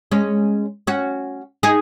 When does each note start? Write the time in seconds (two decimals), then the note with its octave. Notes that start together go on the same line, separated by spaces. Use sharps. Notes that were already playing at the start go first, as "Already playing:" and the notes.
0.12 G#3 C#4
0.87 C#4 F#4
1.63 D#4 G#4